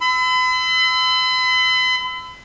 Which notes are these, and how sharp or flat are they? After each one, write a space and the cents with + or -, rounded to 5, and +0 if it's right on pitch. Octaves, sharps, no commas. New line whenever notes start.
B5 +45 E6 +0